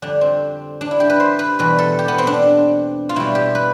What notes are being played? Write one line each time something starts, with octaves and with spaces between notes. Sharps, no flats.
F2 D3 G3 D4
C4
D4
E4
G4
B4
C5
B4
E2 B2 G3 B4
A4
G4
B3
C4
D4
F4
B2 G3 E4
G4
B4